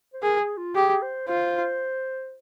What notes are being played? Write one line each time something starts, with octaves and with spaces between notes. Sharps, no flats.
C5
G#4 A#4
G#4
F4
G4 G#4
C5
F4 C5